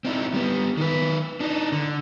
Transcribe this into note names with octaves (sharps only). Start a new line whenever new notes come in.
C4 D#4 E4
G3 B3
D#3 B4
D4 D#4
D3